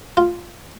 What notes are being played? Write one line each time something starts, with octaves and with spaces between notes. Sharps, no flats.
F4